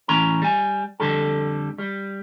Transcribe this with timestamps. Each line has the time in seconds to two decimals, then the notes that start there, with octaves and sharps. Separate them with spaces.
0.08 A2 E3 C#4 A#5
0.42 G3 G#5
1.00 F2 D3 G3 A4
1.78 G3